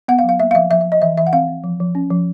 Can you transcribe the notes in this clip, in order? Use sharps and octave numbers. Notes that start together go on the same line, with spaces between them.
B3 F#5
F5
F#3
F5
A#3 E5
F5
F3 E5
F3 E5
E5
F3
D#5
E3 E5
E3 E5
F#5
C4 F5
C4
F3
F3
C#4
F3